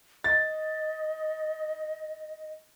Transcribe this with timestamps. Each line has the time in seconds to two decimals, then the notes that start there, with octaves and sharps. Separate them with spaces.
0.24 D#5 A6